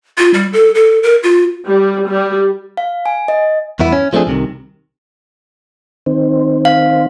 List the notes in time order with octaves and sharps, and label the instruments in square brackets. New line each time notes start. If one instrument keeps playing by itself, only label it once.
[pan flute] F4
G3
A4
A4
A#4
F4
[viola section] G3
G3
[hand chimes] F5
G#5
D#5
[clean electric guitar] E2 G2 B3 E4 B4
C#4
F3 A3 C4 D4 G#4
C2 C3 D#3
[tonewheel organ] D#3 C4
[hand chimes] F5